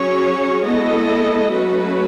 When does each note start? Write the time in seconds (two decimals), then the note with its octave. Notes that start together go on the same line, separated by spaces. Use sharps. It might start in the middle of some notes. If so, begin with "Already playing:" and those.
Already playing: F#3 C#4 G#4 C#5
0.64 G#3 B3 E4 A4 D#5
1.50 F#3 A3 C#4 F#4 B4